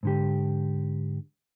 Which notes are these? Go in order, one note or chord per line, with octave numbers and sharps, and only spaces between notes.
G#2 D3 G4